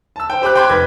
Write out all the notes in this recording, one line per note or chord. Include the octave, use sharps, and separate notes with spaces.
A5 E6
C5 G5
G4 C5 B5 D6 F#6
G5 B5 C6 D6 G6 G#6
F1 B4 G#6 B6